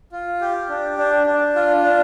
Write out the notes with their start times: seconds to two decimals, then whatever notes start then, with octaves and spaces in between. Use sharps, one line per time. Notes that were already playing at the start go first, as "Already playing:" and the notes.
0.12 F4
0.41 G4
0.69 D4
0.97 D4
1.26 D4
1.56 F4
1.83 D4